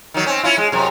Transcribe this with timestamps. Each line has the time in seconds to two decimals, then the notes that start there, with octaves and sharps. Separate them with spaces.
0.14 D#3 F#3
0.26 C4 C#4
0.43 C#4 E4 F4
0.58 G#3
0.72 F#2 C3